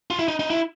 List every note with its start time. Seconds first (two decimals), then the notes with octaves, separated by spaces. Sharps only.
0.10 F4
0.19 E4
0.28 D#4
0.39 D#4
0.50 E4